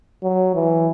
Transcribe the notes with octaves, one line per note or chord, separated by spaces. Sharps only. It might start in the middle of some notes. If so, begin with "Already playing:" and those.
F#3
E3